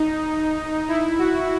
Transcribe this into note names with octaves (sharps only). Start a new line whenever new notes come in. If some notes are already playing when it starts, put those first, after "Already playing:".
Already playing: D#4
E4
F#4